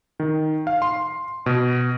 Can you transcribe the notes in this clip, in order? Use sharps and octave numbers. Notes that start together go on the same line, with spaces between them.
D#3
F5
C6
B2